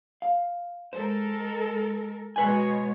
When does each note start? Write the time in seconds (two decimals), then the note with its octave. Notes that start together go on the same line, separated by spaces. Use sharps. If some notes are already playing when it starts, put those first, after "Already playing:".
0.22 F5
0.93 G#3 A4 A#4 C5
2.36 B2 G#3 B4 C#5 G#5